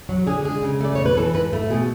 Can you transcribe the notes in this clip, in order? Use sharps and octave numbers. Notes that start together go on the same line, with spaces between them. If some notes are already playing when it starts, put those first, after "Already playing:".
F#3 F#4
D3 G#4
G#3 G#4
C#3
A3 D5
B2 C#5
B4
E3 A4
G#2 B4
A3
B2 G#4